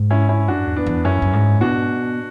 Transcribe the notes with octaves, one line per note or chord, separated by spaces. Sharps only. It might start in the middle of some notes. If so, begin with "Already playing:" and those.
Already playing: G#2
C#4 E4
C#4 E4
F#2 D4 F#4
E2
B3 D4
E2
F#2 C#4 E4
F#2
G#2
B2 D4 F#4